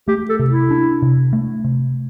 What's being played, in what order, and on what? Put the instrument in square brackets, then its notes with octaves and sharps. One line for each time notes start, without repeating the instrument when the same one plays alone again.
[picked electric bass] A3 [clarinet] G4
[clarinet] A4
[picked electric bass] C3
[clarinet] E4
[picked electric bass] D4
C3
A3
C3